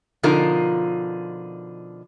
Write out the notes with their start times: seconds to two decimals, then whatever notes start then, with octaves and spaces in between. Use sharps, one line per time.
0.23 B2 D3 F3 D#4 F4 A#4